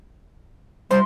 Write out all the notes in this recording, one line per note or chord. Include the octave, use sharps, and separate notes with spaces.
G3 C5 C6